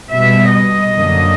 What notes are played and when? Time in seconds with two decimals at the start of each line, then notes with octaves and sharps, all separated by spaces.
0.10 B2 G3 B3 E5
0.53 D#5
0.95 F#2 D3 F#3 A#3